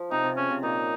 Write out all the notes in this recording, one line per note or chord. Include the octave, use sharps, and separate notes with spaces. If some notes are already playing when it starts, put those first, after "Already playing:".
Already playing: F3
C3 D#4
C3
C#3 C#4
C3
A#2 D#4